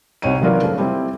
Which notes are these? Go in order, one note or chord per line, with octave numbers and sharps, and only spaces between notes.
C2 C3 D#4 C#5 G5 D#7
D#3 E3 F#3 F4 A#4 D5
C#3 F3 A3
G3 C4 E4